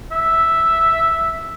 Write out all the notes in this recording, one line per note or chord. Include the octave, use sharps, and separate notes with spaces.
E5